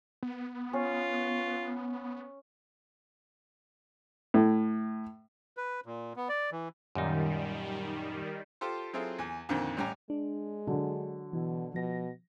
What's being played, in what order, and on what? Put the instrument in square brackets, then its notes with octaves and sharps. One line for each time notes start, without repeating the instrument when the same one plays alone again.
[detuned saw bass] B3
[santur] C#4 [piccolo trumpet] F4
[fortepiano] A2
[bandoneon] B4
A#2
B3
D5
E3
[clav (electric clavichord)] F#2 A#2 D#4 [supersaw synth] D#3 G3
[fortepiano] F4 G4 A4 C5
F#3 C4 E4 F4 G#4 A4
E2 G#5
F2 A#2 D3 D#3 C4
A1 F#2 G3 G4 G#5 A#5
[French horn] G#3 [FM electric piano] D4
[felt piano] D3 F#3
[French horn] B2 [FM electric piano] E3
[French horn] B2 [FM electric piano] F3 A#6